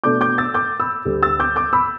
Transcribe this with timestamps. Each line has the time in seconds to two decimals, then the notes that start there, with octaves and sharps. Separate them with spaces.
0.04 B2 A3 D4 D6 G6
0.21 D6 G6
0.38 E6 A6
0.54 D6 G6
0.80 B5 E6
1.05 D2 D3 G3
1.23 E6 A6
1.40 D6 G6
1.56 D6 G6
1.73 B5 E6